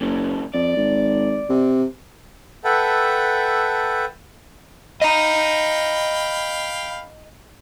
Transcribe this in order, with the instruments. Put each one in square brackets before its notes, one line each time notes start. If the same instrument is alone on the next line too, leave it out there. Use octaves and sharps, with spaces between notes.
[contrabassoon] F#1 [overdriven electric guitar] A#2 C#3
[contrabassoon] F2 [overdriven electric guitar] D5
[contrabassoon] G#1
C3
[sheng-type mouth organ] A4 B4 E5 F#5 G5 A5
[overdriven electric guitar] D#5 A#5 [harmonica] F5 G5 B5